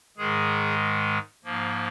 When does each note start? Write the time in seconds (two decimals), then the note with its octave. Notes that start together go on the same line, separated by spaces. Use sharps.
0.18 G#2 D#3 G#3 G#4
1.44 G#2 F3 A#3